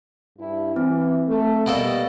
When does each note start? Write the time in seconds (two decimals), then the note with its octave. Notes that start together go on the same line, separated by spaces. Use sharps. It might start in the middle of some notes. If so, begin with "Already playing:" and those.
0.38 G2 E4
0.76 E3 C4
1.27 A3
1.66 B2 G3 A#3 A4